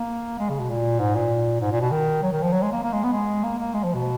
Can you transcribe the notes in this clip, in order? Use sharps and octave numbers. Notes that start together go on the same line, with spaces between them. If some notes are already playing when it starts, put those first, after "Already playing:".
Already playing: A#3
G#3
C#3
B2
A#2
G#2
A#2
G#2
A#2
B2
D#3
F#3
D#3
F3
F#3
G#3
A#3
A#3
G#3
B3
G#3
A#3
A#3
G#3
F3
B2